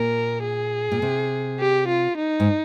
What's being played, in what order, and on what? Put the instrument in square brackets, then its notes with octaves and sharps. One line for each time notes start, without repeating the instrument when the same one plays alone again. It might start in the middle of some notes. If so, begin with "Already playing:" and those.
Already playing: [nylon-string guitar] A#2 [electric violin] A#4
[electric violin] G#4
[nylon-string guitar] A#2
C3
[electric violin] G4
F4
D#4
[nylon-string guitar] G#2